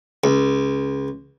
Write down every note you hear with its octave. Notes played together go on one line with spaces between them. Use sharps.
C#2